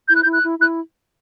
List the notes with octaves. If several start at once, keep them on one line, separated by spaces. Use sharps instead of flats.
E4 G6
F#6
E4 G6
F#6
E4
E4 F#6